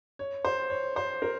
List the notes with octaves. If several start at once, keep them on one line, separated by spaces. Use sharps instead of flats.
C#5
C5
C#5
C5
A#4